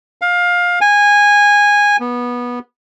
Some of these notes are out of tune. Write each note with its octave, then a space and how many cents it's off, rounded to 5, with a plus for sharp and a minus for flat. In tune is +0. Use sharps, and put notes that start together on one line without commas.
F5 +20
G#5 -15
B3 -20